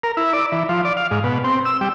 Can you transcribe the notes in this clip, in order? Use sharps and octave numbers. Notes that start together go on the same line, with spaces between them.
A#4
E4
D5
E3
F3
D5
F5
G#2
B2
C4
E6
G3